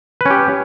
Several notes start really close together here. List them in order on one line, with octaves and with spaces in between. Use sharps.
B4 C#4 G4